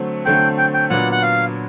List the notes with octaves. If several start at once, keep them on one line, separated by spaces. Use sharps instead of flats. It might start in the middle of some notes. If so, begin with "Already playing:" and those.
Already playing: D3 F#3 A3 C4
D3 F#3 A3 C4 G5
G5
G5
A#2 F#3 B3 D4 F#5
F#5
F5